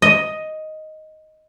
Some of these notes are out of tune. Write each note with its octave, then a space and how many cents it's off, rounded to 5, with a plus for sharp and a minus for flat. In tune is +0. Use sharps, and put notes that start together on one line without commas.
D#5 +5